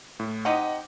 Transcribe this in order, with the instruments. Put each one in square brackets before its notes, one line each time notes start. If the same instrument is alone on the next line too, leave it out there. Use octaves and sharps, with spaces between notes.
[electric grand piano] A2
[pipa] C4 D#4 G4 [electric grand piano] D#5 F#5